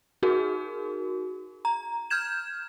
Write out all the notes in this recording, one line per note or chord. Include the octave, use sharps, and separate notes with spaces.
D#4 F#4 G#4 A#4
A#5
F6 G6 G#6 E7